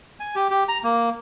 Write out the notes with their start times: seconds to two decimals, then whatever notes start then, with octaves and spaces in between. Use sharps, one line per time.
0.20 G#5
0.35 G4
0.50 G4
0.68 A#5
0.84 A#3